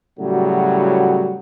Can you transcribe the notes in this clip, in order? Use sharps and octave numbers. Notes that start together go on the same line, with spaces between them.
A2 C#3 F#3 G3 F#4